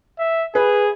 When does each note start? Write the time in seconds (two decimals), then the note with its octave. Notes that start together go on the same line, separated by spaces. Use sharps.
0.19 E5
0.55 G#4 B4